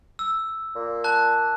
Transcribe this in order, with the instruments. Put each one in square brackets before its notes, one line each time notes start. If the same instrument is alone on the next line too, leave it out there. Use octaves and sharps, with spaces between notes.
[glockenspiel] E6
[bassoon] A#2
[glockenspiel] A5 F#6